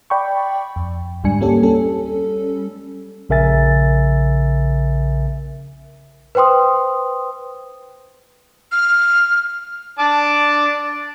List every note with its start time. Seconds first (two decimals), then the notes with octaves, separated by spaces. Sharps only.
0.10 D5 G5 B5 C#6
0.76 F2
1.24 D2 G#2 G3 D4 G#5 C#7
1.41 G3 A#3 C#4 G4 A4
1.63 G3 C#4 A4
3.29 A#1 C#3 A#4 E5 G#5 A6
6.35 B4 C5 G5 C6 D#6
8.72 F6
9.99 D4 A5 D6